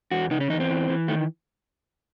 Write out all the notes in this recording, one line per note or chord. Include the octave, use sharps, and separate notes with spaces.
E2 F#4
C#3 D#4
C#4
E2 D#4
C4
E3
E3
D#3 A3